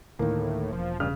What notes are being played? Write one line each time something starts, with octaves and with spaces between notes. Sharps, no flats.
D2 A2 D#3 A#3
E1 F3
G2 C#3 F6